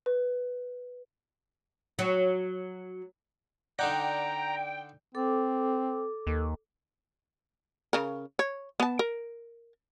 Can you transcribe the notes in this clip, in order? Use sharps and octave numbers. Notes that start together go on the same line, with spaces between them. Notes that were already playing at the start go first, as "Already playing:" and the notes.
B4
F#3
D3 D#4 D5 F#5 G5 A#5 G6
C4 A4 D6
D#2
C#3 A#4
C#5
B3 A5
A#4